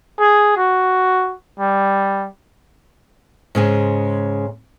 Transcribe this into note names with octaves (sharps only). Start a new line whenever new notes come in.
G#4
F#4
G3
G#2 C#3 G#3